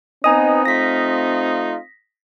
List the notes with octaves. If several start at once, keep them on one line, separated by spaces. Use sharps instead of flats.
B3 C4 D#4 D#5 G#5 A#5 D#6
A3 D#4 F4 A#6 B6